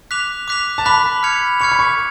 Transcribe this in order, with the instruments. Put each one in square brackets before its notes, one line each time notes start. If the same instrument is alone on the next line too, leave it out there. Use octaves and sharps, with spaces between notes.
[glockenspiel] D6 F#6 B6 F7
D6 F#6 B6 F7
[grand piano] A5
[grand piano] B5 [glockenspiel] D6 F#6 B6 F7
[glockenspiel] F6 G#6 C#7 F7
[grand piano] C#6 [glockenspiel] F6 G#6 C#7 F7
[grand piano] B5
C#6